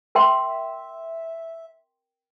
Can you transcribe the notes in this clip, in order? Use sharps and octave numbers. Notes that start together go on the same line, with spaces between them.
A#4 E5 G5 C6